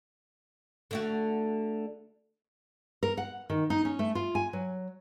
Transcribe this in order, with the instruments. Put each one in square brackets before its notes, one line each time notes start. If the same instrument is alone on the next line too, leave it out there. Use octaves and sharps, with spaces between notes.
[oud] D3 A3 F#4
[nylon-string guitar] A#4
F#5
D#3
D#4
C#4
A3
F4
G#5
F#3